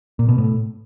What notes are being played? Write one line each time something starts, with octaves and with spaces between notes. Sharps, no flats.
A#2
B2
A2